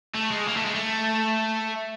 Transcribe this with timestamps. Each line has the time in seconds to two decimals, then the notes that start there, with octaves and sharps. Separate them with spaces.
0.15 A3
0.31 G#3
0.48 A#3
0.57 A3
0.65 G#3
0.75 A3